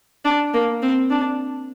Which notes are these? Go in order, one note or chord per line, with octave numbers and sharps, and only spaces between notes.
D4
A#3
C4
D4